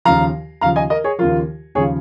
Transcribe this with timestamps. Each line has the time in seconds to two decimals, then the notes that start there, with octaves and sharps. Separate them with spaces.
0.05 D#2 C#3 F3 F5 A#5
0.61 D#2 C#3 F3 F5 A#5
0.76 D#5 G#5
0.90 A#4 D#5
1.04 G#4 C#5
1.19 D#2 C#3 F3 F4 A#4
1.75 D#2 C#3 F3 G#4 C#5